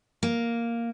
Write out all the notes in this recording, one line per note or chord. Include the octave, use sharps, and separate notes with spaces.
A#3